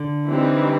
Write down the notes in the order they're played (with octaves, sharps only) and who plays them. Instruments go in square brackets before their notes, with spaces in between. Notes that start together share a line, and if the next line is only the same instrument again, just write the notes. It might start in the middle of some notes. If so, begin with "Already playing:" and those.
Already playing: [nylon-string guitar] D3
[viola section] E3 G3 C4 D#4